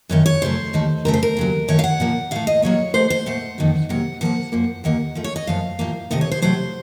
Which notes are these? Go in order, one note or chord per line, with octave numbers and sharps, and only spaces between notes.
F#2 D#3 A3 C#5
C#5
F#2 C#3 F#3 A3 C5
D#2 D#3 A3
F2 C#3 A3 A#4
C5
A#4
D#2 C#3 F#3
F#2 D#3 A3 C#5
F5
F#5
A#2 F3 A#3
A2 A3 F5
D#5
A#2 F#3 A#3 C#5
C3 F3 A3 C5
C5
A#2 A3 F#5
F2 D#3 F#3 A#3
C3 F#3 A#3 F#5
A#2 F3 A#3 F#5
F#2 F3 A#3
D#2 D#3 A#3 F#5
F#2 F3 A3
C#5
D#5
F#2 F3 A3 F5
A2 F3 A#3
C3 D#3 A3 D#5
C#5
C5
C3 F#3 A3 C5